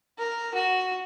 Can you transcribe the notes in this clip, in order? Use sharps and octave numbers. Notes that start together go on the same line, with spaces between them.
A#4
F#4